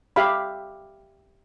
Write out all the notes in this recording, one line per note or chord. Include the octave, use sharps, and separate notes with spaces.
G4 E5 F5 B5